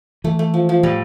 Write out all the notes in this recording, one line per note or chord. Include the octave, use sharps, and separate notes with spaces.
E3 A3
A3
F3
F3
A2 G3